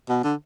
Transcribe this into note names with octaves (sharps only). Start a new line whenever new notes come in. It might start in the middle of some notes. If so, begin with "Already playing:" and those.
B2
D3